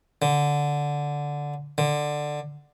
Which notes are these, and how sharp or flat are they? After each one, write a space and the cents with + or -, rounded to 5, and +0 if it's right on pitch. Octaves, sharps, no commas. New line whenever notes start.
D3 -10
D3 +10